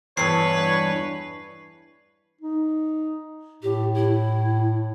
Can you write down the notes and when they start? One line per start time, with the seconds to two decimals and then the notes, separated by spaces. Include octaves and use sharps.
0.17 E2 G2 B4 C#5 C7
2.41 D#4
3.63 A2 G4
3.95 E4